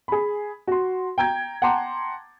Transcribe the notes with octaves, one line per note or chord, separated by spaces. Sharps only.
G#4 B5
F#4 C6
G5 A#5 G6 G#6
F#5 G5 A5 A#5 C6 D6